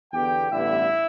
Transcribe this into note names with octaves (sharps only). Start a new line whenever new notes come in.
E2 D3 B3 G4 G5
A1 G2 D3 B3 E4 E5